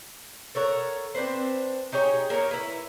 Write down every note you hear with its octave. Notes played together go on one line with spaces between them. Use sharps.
A4 A#4 C#5 F#5
C4 D4 B4 C5
D#4 G4 G#4 C#5
A#3 A#4 C#5 F5
E4 B4